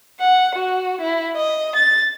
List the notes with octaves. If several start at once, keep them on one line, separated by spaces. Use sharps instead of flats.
F#5
F#4
E4
D#5
A6